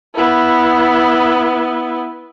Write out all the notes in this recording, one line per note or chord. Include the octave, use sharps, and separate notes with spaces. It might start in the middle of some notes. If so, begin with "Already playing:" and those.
B3 E4